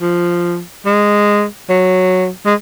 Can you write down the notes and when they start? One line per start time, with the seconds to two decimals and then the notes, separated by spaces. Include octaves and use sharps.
0.01 F3
0.86 G#3
1.70 F#3
2.46 G#3